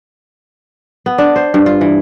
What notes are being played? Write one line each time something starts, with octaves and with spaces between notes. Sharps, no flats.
B3
D4
C5
G2
F4
E3